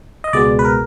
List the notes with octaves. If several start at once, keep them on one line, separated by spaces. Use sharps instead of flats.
D#5
C#2 B2 G#3 B3 D5
B4
A#4